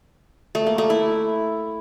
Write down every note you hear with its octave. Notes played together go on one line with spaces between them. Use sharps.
A3
A#3
A3
E4